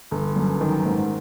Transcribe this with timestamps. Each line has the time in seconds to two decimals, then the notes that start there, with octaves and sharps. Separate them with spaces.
0.11 G1
0.36 F#2
0.61 D#3
0.85 G#2